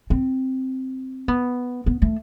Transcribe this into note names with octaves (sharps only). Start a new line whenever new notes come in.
C4
B3
B3
A3